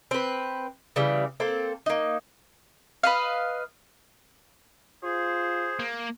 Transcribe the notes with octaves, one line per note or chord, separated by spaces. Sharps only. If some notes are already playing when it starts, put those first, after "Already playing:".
C4 B4
C#3 E3 G3
A#3 C4 A4
A#3 D#4
B4 D#5 F5
F4 G#4 C5
A#3